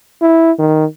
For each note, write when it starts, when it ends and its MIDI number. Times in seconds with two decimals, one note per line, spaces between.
0.22 0.52 64
0.59 0.85 51